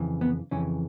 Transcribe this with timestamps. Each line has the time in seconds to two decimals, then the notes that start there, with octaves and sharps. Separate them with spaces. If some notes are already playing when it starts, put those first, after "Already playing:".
Already playing: F2 C#3 E3
0.21 B3
0.51 F2 C#3 E3 C#4